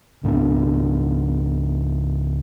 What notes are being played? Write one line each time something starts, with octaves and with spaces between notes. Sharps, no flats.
C#2 G#2 B3 D4